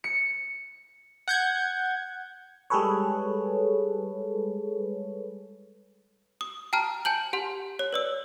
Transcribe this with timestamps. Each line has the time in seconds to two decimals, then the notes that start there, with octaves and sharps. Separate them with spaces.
0.04 C#7
1.28 F#5 G6 G#6
2.70 G3 G#3 G#4 A4 B4 C#5
6.41 D#6
6.73 G5 A5 A#5 F6
7.05 G#5 A5 G6 F#7
7.33 G4 F#5 C6
7.79 C#5
7.93 B4 D5 E6